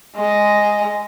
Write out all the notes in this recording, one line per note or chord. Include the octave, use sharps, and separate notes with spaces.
G#3 D#5